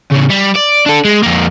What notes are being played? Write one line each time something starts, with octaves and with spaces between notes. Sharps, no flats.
A2 C#3
G3
D5
D4 A4
G#3
F2 A#3